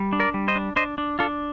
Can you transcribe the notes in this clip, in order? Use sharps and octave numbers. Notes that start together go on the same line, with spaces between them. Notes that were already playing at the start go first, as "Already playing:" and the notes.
Already playing: G3
D4
A#4 D5
G3
C5 D#5
D4
D4 C5 D#5
D4
D4 F4 A4